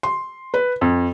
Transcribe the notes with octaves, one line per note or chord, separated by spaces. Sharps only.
C6
B4
F2